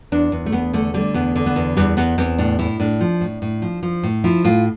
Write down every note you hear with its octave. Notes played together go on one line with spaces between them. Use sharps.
E2 D4
E2
A3
E2 B3
D3 A3
D3 G3
E2 B3
D3
B3
E2
E2 G3
E2 B3
E2 C4
A2 D4
A2 E4
A2 D4
F3
A2
A2
F3
F3
A2
F3 E4
A2 F4